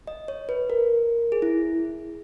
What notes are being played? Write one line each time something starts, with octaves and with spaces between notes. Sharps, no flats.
D#5
C#5
B4
A#4
G#4
E4